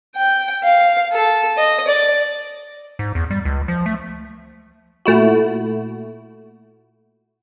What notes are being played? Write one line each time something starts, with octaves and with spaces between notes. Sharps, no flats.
G5
F5
A4
D#5
D5
G#2
E2
G3
C#2
F3
A3
A#2 A3 E4 F#4